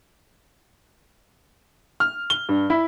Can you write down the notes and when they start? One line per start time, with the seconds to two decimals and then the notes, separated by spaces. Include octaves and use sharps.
2.00 F6
2.30 G7
2.49 G2
2.70 E4